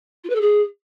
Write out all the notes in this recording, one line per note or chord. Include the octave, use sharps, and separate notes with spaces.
F4
B4
A4
G#4